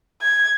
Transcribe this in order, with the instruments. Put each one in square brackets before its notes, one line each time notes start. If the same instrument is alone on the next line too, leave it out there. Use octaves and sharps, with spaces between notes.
[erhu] G#6